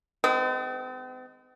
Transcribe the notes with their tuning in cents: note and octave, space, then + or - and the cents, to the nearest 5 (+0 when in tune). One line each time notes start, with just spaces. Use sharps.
D#3 +0 G#3 +0 C4 -45